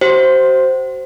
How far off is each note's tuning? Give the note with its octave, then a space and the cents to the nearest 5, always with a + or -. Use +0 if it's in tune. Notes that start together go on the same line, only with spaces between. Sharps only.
F#4 +45 C5 +0